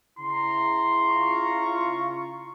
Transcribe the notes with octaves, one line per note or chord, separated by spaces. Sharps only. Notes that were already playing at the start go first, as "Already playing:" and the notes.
C#3 E4 A#5 C6
F4 C#6